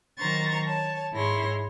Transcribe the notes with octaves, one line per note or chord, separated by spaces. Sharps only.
D#3 F#3 C5 A#5 C#6 A6
C#5 A5
G#2 E4 G#4 C#5 C6 A#6